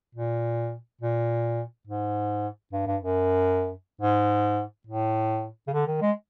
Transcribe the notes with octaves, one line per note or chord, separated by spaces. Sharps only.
A#2
A#2
G#2
G2
G2
F#2
G#2
A2
C#3
D3
D#3
G#3